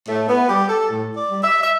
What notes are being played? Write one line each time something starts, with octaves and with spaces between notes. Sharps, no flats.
A2 A3
B3
G3 G4
A4
A2
D5
G3
E5
E5